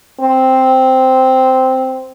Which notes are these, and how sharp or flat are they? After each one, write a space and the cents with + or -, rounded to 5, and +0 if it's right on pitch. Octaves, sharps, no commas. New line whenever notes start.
C4 -5